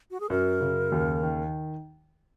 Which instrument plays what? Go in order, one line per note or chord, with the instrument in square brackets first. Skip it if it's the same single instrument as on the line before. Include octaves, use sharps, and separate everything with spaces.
[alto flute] F#4
G#4
[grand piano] F#2 [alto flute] A#4
[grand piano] C#3
D#2
D#3